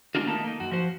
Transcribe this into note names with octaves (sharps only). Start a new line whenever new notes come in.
G#3 A#3 C#4 D4 F4 F#4
D#3 A3 A#3 D#4 A5
A#3 D#4
F#2 F#4
F3 F#4 C5